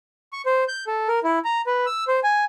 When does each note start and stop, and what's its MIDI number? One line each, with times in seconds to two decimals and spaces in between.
0.33 0.42 85
0.46 0.64 72
0.68 0.84 91
0.87 1.08 69
1.08 1.19 70
1.24 1.39 64
1.45 1.62 82
1.67 1.86 71
1.86 2.04 88
2.08 2.20 72
2.24 2.45 80